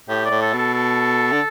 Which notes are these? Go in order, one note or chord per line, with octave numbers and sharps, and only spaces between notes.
A2 G4
D5
A2
A4
B2
A4
A4
D3